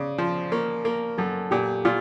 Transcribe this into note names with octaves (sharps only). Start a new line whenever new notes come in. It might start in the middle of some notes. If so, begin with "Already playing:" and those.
Already playing: C#3 D5
F3 C5
A#3 C#5
A#3 A#4
F#2 A4
A#2 G4
A#2 F4